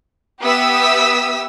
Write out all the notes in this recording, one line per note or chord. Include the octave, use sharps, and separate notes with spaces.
B3 G4 E5 D#6 E6 B6